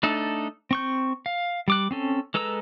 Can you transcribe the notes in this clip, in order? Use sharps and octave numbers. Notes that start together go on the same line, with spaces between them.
A3 D4 D#4 A4
C4 C#6 G6
F5
G3 D6 F#6
C4 C#4 A4
G#3 A4 B4 A#5 E6